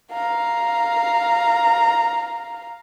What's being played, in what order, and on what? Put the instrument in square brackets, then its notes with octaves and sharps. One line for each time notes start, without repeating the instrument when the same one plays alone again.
[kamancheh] F5 A#5